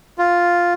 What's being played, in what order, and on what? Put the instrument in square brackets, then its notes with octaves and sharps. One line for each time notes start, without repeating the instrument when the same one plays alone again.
[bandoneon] F4